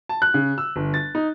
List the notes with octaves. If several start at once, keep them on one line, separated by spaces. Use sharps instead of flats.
A5
F#6
C#3
E6
G1
A6
D#4